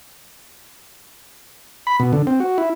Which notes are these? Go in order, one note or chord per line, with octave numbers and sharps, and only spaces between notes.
B5
B2
D3
C4
F#4
E4